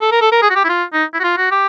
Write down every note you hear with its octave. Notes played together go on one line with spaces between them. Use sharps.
A4
A#4
A4
A#4
G#4
F#4
G4
E4
F4
D#4
E4
F#4
F4
F#4
G4